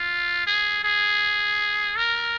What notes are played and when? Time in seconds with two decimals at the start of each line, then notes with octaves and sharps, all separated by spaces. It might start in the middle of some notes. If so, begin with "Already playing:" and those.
Already playing: F4
0.46 G#4
0.84 G#4
1.97 A#4